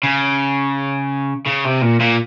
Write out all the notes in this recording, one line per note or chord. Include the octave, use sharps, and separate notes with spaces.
C#3
C#3
C3
A#2
A#2